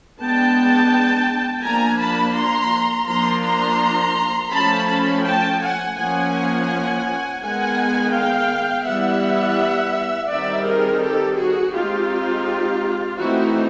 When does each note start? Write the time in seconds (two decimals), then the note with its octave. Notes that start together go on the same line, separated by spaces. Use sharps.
0.21 G#3 B3 D4 G5 A5
1.65 F3 A#3 D4 G#5 A#5
2.01 A5 B5
2.37 A#5 C6
3.09 F3 A#3 D4 A#5 C6
3.45 A#5 C6
4.53 F3 A3 C#4 A5 B5
4.89 A5 B5
5.25 G5 A5
5.61 F#5 G#5
5.97 F3 A#3 C#4 F#5 G#5
7.42 D#3 G#3 B3 F#5 G#5
8.13 F5 G5
8.86 E3 G3 B3 E5 F#5
10.30 D#3 G3 C4 D#4 D5 E5
10.66 G#4 A#4
11.02 G4 A4
11.38 F#4 G#4
11.74 G#3 C4 D#4 F4 G4
13.18 E3 A3 C4 D#4 E4 F#4